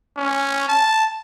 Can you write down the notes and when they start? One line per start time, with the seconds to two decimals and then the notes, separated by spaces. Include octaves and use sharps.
0.17 C#4
0.69 A5